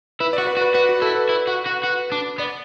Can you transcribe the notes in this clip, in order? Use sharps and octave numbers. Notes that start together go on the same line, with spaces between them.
E4 B4
D5
F#4
B4
F#4
B4
F#4 B4
F#4
E4 A4
B4
E4
F#4
F#4
F#4
D4
B3 D5